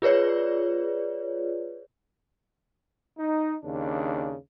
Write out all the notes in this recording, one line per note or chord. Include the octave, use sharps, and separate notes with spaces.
F4 G#4 B4 C#5 D5
D#4
D#2 C#3 D4